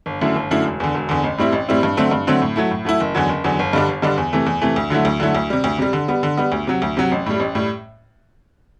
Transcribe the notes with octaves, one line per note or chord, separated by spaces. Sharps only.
G1
F#2 D3 A3 E4
G1
F#2 D3 A3 E4
E1
E2 D3
E1
E2 D3
A1
A2 G3 C4 E4
A1
A2 G3 C4 E4
G2
D3 F#3 A3 C4
G2
D3 F#3 A3 C4
A2
F#3 A3 E4
A2
F#3 A3 E4
F#1
E2 D3 F#3
F#1
E2 D3 F#3
G1
G2 D3 G3 D4
G1
G2 D3 G3 D4
E2
C3 E3 A3
E2
C3 E3 A3
D2
D3 F#3 A3 E4
D2
D3 F#3 A3 E4
D2
C3 G3
D2
C3 G3
D3
G3 B3
D3
G3 B3
D2
C3 F#3
D2
C3 F#3
A1
A2 G3
A1
A2 G3